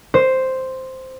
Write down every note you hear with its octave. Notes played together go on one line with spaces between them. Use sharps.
C5